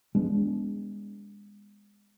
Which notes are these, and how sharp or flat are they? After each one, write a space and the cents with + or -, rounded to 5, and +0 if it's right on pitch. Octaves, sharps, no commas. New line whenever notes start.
G#3 -20 B3 +0 D4 -30